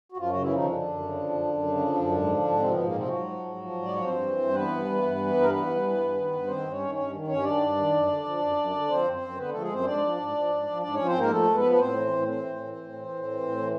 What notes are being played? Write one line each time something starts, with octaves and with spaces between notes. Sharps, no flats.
F#4
F#2 F3 F4
C#3 F#3 F#4
E3 E4
D#3 F3 D#4
F#2 D3 D4
F#2
C#3
F3
F#2
F#2
C#3
F3
F#2
G#2
F3
G#2
C3 F3 C4
G#2 B2 B3
A#2 A#3
C3 F3 C4
G#2 F#3 F#4
F3
G#2
F3
G#2
D5
F3
C#5
G2 C4 C5
E3
G2
E3 B3 B4
G2
E3
G2
E3
G2
A#4
E3 B3 B4
G2
E3
G2
D#3
G2
D#3 C4 C5
G2
C#4 C#5
D#3
G2 C#4 C#5
D#3
G2 C#4 C#5
D#3 D4 D5
G2
D#3
F#2
D3
F3
F#2
F#2
D3
F3 C4 C5
F#2
C4 C5
F#2
D3 B3 B4
F3 A3 A4
G#3 G#4
F#2 C4 C5
G#2 D4 D5
F3
G#2
F3
G#2
F3
G#2 D4 D5
F3 C#4 C#5
C4 C5
G#2 A#3 A#4
F3 A3 A4
G#2
B3 B4
F3
B4
A2 C4 C5
E3
A2
E3 C4 C5
A2
E3
A2
E3
A2
E3
A2
E3